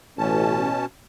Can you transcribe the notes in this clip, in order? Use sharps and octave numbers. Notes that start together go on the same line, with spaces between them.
A1 B2 C#4 A5